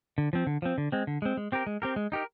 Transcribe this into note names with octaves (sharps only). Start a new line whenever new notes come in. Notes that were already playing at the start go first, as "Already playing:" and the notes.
D3
F3 C4
D3
F3 C4
D3
G#3 C4
D3
G#3 C4
G#3
C4 G4 A#4
G#3
C4 G4 A#4
G#3
D#4 G4 A#4